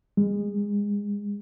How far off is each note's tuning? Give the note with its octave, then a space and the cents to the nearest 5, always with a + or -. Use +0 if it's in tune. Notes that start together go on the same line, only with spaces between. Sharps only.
G#3 -25